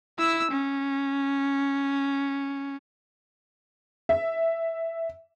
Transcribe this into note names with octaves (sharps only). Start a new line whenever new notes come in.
E4 E6
C#4
E5